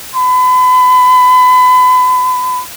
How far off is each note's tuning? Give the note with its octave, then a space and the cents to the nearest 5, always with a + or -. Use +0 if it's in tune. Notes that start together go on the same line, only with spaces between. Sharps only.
B5 +35